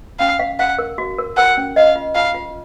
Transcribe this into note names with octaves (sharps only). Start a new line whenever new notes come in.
C#4 F5
F5
F5 F#5
A#4
F#4
A#4
A#4 F#5
C#4
D#5 F5
F4
F4 F5
F4